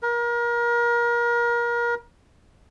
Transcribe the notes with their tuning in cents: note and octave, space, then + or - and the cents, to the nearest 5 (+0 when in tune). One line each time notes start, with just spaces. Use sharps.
A#4 +30